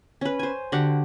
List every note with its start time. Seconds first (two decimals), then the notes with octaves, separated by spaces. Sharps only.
0.21 C#4 B4
0.39 C5 G#5
0.72 D3 F#4 G4 F#5